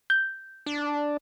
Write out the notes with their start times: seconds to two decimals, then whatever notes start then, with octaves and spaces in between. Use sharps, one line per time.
0.10 G6
0.66 D4